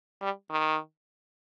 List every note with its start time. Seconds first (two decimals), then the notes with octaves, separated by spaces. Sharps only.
0.22 G3
0.51 D#3